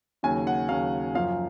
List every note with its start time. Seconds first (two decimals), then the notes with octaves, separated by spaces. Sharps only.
0.23 D#2 C#3 F#3 G#5
0.47 F#5
0.69 D#2 C#3 F#3 F5
1.15 F#2 F3 F5